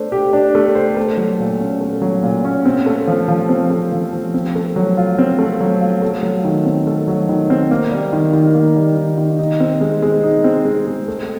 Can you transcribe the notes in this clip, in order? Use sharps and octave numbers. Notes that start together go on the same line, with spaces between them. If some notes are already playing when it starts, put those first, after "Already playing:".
Already playing: A3 D4 C5
G4
D4
A3
C5
A3
F#3
A#2
C#4
A3
F#3
A#2
C#4
C4
A3
F3
F3
C4
A3
F3
F3
C4
A3
F#3
F4
C4
A3
F#3
F4
A3
F#3
D#3
C4
A3
F#3
D#3
C4
A#3
G3
D#3
D#3
A#3
G3
D#3
D#3
D#4
C4
G#3
G#3
D#4
C4
G#3
G#3
A3